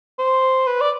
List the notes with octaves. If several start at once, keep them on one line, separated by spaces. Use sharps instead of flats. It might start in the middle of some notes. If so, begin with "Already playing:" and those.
C5
B4
D5